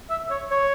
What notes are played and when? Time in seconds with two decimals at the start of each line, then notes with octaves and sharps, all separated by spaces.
0.10 E5
0.30 C#5
0.51 C#5